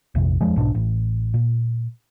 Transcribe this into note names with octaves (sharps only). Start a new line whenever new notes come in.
A#1 F2 C3
D#1 F2 F3 G#3
B1 G#2 B2 D4
A1
A#2